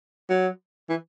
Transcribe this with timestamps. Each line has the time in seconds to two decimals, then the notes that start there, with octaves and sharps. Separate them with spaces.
0.30 F#3
0.89 E3